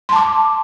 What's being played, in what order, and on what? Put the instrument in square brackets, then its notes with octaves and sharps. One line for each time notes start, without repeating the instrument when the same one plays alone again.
[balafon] C6
A5
D6